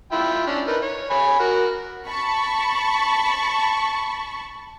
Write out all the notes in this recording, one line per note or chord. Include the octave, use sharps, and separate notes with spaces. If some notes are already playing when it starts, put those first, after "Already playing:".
E4 F4 G5
C#4 D4
D#4 A#4 B4
C#5
C#5 G#5 B5
F#4 A#4
A5 B5 C#6